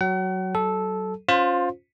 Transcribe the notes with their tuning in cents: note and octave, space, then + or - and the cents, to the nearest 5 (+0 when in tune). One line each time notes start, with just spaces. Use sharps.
F#3 +10 F#5 +40
F#3 +35 A4 -10
C#4 +5 F4 +20 C5 +0